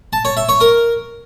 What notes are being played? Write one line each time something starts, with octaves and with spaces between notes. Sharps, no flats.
A5
C#5
E5
C#5
A#4